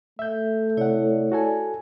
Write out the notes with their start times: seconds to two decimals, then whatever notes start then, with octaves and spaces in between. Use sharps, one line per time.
0.19 A3 E5 G6
0.77 C3 E4 C#5 D5 F#5
1.32 F#4 A4 G#5